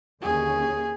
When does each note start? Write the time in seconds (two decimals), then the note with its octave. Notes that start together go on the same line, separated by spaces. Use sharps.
0.22 D#2 D3 C#4 G#4